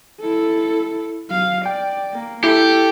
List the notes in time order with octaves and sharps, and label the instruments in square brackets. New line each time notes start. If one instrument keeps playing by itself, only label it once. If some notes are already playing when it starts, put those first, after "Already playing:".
[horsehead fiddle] E4 A4
[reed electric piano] F#3 [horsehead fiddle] F5
[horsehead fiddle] D5 [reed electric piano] G5
[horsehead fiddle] A#3
[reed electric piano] E4 [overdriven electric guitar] G4 [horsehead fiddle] A4